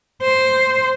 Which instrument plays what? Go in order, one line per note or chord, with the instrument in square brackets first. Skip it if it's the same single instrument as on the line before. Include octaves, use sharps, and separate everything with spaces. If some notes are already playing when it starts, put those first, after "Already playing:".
[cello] C5